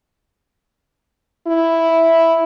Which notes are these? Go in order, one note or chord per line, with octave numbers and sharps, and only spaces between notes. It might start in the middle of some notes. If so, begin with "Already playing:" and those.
E4